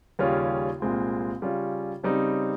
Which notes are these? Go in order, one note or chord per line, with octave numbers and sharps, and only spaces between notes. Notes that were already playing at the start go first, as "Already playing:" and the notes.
D#2 C#3 G3 C#4 F4
C2 A#2 G#3 C4 F4
C#3 G3 C#4 F4
C#3 G3 C4 D#4